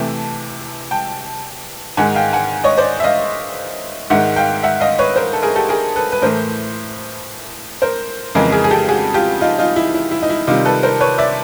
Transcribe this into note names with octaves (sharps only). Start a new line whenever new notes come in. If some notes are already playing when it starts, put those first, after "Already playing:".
Already playing: C3 E3 A3 G5 A5
G5 A5
G#2 D#3 G#3 F#5 G#5
F5 G5
F#5 G#5
C#5 D#5
C5 D5
E5
D#5 F5
G#2 D#3 G#3 E5 F#5
F5 G5
E5 F#5
D#5 F5
B4 C#5
A#4 C5
A4
G#4 A#4
G4 A4
G#4 A#4
A4 B4
B4
A2 E3 A3 A#4 C5
A#4 C5
F2 C#3 E3 G#3 G#4 A#4
G#4 A#4
G#4
G4 A4
F#4 G#4
F4 G4
D#4 F4
D#4 F4
E4
E4
E4
D#4
E4
C3 D#3 G3 D#4 F4
A4 B4
A#4 C5
B4 C#5
D5 E5